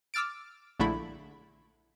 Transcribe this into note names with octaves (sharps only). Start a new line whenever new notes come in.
D6 E6 F6 A6 D7
A#1 D3 A3 E4 B5